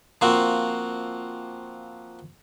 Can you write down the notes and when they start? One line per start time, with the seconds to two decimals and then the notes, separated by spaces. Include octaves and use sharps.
0.21 F3 A#3 C4 F#4